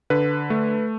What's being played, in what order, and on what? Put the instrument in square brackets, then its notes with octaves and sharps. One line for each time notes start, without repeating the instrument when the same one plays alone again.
[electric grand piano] D3 B4
A3